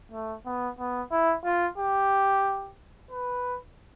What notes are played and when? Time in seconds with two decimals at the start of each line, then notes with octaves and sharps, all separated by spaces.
0.12 A3
0.46 B3
0.79 B3
1.11 E4
1.45 F4
1.78 G4
3.11 B4